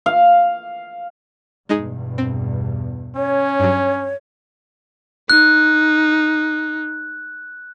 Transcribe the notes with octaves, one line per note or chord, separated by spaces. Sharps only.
F5
E2 G2 B2 G#3 D#4 G#4
C4
C#4 C#5
G2 F#3
D#4 F#6